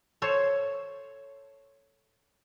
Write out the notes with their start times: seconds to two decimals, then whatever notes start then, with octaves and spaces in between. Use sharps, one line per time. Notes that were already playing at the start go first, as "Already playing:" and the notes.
0.22 A4 C5 C#5